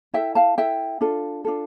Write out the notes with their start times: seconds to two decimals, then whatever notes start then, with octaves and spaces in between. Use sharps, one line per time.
0.14 E4 A4 E5 G5
0.35 F5 A5
0.58 E4 A4 E5 G5
1.01 D4 F4 A4
1.45 D4 F4 A4